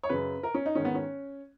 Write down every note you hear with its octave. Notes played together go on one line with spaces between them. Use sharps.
C#5
F#2 C#3 B4
A#4
C#4
D#4
G#2 D#3 C#4
B3
C#4